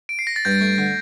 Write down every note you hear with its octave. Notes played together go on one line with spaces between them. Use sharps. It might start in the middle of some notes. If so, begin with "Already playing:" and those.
D7
C7
A#6
A6
G2 G6
A3
D3